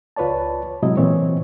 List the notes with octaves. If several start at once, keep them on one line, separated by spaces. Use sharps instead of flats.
C#2 F4 B4 C#5 D5 A5
A2 C3 F#3 G#3 E4 D#5
A#2 E3 C4 C#5